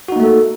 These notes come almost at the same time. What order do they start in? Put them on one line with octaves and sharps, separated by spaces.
F#4 D#4 A#3 A3 A4